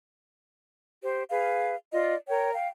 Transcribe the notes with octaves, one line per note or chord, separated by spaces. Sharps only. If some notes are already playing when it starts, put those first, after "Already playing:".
G4 C5
G#4 B4 F5
F4 D5 D#5
A#4 C#5 G5
F5 G5